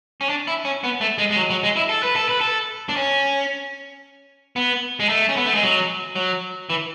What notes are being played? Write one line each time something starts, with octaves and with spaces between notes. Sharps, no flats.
C#4
D4
E4
C#4
B3
A3
G#3
G#3
F#3
F#3
G#3
E4
A4
B4
A4
B4
A4
D4
C#4
B3
G#3
A3
C#4
B3
A3
G#3
F#3
F#3
E3